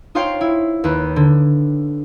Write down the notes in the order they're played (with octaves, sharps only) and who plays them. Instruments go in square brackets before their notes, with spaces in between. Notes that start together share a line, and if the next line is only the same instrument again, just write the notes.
[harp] D#4 F4 C5 C#5 F5 G5
E4
D#2 B4
D3